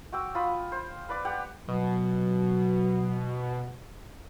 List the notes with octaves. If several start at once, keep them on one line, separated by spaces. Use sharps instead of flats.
F#4 G5 D6 E6
F4 B5 D#6
C5
B4 D5 D6
G4 F#5 G5
B2 F#3